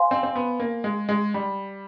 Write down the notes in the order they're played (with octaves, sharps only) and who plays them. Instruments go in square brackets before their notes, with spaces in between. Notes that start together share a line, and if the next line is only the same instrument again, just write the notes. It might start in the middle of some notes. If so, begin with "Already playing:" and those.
Already playing: [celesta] C5 F5 G#5 C6
[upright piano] C4
C4
B3
A#3
G#3
G#3
G3